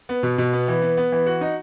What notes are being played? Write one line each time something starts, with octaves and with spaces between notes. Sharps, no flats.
B3
B2
B2
B3
E3
B3
B3
E3
F#4
D#4